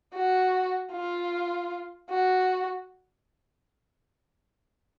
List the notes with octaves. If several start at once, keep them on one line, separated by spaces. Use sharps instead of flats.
F#4
F4
F#4